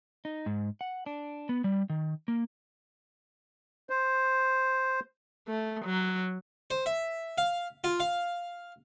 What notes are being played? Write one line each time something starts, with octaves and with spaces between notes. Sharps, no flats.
D#4
G#2
F#5
D4
B3
G3
D#3
A#3
C5
A3
F#3
C5
E5
F5
F4
F5